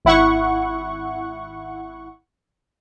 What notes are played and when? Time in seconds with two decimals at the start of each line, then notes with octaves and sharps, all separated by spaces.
0.05 G#1 E4 F#5 C#6